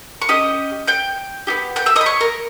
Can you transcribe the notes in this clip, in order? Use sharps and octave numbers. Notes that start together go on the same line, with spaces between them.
C#6
C#4 G4 D#5 D#6
G5 G6
B3 D#4 G4
G5 G6
E5 E6
D#5 D#6
B5
C#5 C#6
A#4 A#5